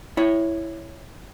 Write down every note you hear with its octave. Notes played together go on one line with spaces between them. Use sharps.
E4 C#5